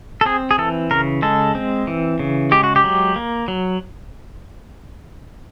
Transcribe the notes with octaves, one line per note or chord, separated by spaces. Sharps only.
A4
C4 G#4
G#4
E3 A4
C#3 A#4
G#3 A4
C4
E3
C#3
G#3 G4
F#4
G4
F#3
A#3
F#3